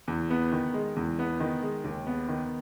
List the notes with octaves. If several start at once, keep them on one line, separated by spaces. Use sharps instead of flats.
E2
B3
D#3
G#3
E2
B3
D#3
G#3
D#2
B3
D#3